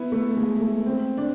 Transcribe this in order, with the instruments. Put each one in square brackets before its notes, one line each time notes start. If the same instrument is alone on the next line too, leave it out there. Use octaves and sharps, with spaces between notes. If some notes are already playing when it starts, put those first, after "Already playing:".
Already playing: [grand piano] B3 E4
A3
G#3
A3
C4
D4